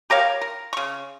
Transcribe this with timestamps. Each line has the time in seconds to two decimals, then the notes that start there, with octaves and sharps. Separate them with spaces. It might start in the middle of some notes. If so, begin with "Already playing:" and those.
0.10 G4 A#4 C#5 F5
0.41 A#4
0.73 C#3 C#6